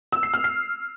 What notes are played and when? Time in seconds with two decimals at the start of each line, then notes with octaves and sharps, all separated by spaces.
0.12 E6
0.23 C7
0.34 F6
0.44 C7